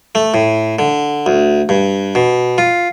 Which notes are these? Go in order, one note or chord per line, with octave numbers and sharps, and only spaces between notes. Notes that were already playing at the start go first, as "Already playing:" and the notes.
A3
A2
D3
D2
G2
B2
F4